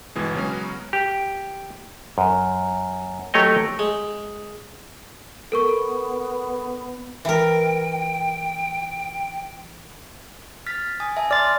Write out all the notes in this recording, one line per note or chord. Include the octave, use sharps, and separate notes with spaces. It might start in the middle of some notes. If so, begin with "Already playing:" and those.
G1 B2 E3 G#3
C#3 F#3 G#3 B3 C#4
G4
F#2
F#3 A3 G4 C#5 D#5
G#3
B3 A4 A#4 C#6
E3 A#4 G5
F6 A6 B6
G#5 D#6
E5 G#5 A5
D5 C6 F6 A6